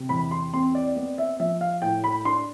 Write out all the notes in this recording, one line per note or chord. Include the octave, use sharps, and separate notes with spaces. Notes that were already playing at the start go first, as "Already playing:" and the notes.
Already playing: C3
E2 B5
C6
C4 C6
D5
B3 D5
E5
F3 E5
F5
A2 G5
B5
D4 C6